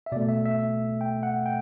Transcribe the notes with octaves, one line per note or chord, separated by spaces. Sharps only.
E5
B2 A3 D5
E5
E5
G5
F#5
G5